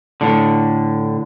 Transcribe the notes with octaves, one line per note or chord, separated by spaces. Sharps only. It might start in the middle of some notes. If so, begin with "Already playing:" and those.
A2 D3